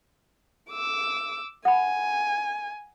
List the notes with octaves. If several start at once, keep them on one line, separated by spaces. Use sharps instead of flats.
D6 E6
F#5 G#5 B5